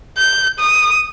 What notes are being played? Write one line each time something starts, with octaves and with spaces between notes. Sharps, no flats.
G6
D#6